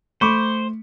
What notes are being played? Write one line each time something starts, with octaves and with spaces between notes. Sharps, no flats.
A3 C5 B5 C#6 D6